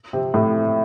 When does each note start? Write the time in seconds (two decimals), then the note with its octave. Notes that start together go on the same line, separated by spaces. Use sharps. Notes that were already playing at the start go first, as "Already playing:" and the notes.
0.13 C3 C4
0.34 A2 A3